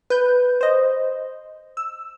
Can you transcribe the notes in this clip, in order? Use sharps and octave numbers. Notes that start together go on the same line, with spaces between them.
B4 G6
C5 D#5
E6